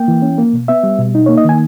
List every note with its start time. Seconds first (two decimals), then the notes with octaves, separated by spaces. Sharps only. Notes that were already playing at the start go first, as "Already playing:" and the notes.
Already playing: A#3 G5
0.08 E3
0.22 C#4
0.38 A#3
0.53 B2
0.68 B3 E5
0.83 G3
0.99 B2
1.15 D#4
1.26 A#3 C#5
1.38 D#5
1.45 D#3 G#5